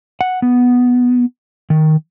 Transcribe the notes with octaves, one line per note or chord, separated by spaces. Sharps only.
F#5
B3
D#3